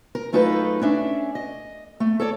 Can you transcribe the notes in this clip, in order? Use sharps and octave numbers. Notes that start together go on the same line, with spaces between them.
A#4
F#2 A3 D#4 F4 G4 B4
C#4 D4 E5
D#5
A3
A4 C#5 D5